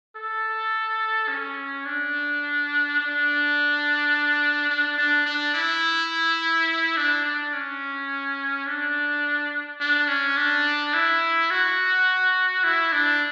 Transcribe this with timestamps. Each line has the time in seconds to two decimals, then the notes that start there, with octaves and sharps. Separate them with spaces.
0.16 A4
1.28 C#4
1.85 D4
3.00 D4
4.70 D4
4.98 D4
5.25 D4
5.54 E4
6.97 D4
7.25 D4
7.53 C#4
8.67 D4
9.80 D4
10.08 C#4
10.37 D4
10.94 E4
11.50 F#4
12.63 E4
12.92 D4